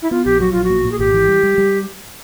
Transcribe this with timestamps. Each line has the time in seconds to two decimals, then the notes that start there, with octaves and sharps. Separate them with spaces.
0.02 E4
0.11 B3 F4
0.25 A#1 G4
0.40 F#3 F#4
0.52 A#1 F4
0.64 F#4
0.69 A#2
0.85 A#2
0.92 G#4
0.99 G#1 G4
1.14 E3
1.28 G3
1.43 G3
1.58 G3